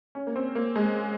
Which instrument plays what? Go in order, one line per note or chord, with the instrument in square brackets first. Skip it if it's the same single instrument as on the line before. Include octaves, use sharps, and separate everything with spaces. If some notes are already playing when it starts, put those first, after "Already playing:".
[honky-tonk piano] C#4
A#3
C4
A#3
G#3